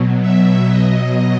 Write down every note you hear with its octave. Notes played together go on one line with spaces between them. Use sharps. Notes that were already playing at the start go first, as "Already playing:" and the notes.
Already playing: B2 F#3
E5
B2 F#3 D#5